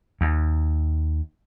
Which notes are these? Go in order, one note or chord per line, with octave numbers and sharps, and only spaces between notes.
D#2